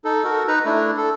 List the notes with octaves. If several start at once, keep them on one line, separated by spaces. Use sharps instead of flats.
D#4 A4
F#4 A4 A#4
D#4 B4 A#5
A3 D4 E4
A4